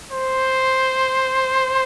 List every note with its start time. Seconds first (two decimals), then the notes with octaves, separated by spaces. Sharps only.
0.12 C5